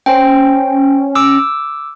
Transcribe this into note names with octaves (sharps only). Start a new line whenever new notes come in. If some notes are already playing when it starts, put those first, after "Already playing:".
C#4 C5 G5
D6 E6